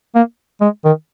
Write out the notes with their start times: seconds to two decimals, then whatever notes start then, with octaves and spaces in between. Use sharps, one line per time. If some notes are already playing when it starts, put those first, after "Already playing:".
0.15 A#3
0.61 G#3
0.85 D#3